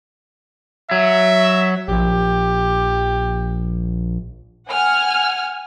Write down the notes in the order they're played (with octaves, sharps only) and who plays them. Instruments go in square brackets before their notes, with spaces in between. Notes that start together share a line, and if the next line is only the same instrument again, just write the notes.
[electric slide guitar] F#3 [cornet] E5
[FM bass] A#1 [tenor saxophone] G4
[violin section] F#5 G#5 F6